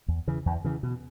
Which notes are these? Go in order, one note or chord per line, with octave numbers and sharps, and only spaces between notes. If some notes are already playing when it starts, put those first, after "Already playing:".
E2
C#3 E3
E2
C#3 E3
B2